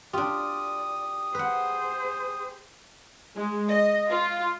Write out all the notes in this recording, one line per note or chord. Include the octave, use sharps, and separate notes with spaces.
D4 F4 G4 D5 D#6
G#4 B4 C5 F#5
G#3
D#5
F4